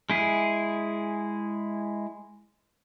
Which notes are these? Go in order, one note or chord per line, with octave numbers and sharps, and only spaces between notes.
G#3 E4 G#4